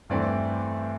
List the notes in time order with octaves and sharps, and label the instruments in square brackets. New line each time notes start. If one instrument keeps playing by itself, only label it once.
[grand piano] G2 E3 A3 C4 D5